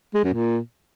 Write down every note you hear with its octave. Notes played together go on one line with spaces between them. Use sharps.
G#3
F#2
A#2